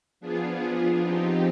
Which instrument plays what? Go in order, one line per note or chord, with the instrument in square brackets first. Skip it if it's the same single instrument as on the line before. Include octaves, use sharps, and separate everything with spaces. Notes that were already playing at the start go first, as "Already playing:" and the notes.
[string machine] F3 B3 D4 F4 G#4
F3 C4 D#4 G4